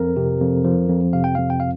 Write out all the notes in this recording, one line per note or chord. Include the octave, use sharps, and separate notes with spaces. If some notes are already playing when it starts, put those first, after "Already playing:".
Already playing: F2 A#4
C3
F2
F3
F2
C3 F5
G5
F2 F5
G5
F5